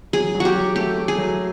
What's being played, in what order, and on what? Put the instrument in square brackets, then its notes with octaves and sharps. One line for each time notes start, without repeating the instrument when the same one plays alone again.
[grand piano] F#3 [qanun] G#4
[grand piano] F#3
[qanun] F#4 G4
[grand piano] F#3
[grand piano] A3 [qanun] G4
[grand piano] A3
[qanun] G#4
[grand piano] F#3